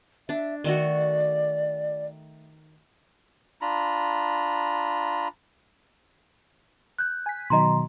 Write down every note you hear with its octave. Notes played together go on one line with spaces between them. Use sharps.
D4 E5
D#3 A3 F#4 D5
D4 F4 A#5 B5
F#6 G6
G#5 B6
B2 D#3 F#3 D#5 A#5 C6